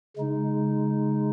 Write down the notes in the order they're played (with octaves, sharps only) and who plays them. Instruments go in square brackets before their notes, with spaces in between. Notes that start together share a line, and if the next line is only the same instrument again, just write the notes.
[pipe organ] C#3 G#3 D#4